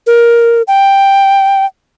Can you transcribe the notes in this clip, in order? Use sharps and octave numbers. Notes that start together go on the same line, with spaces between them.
A#4
G5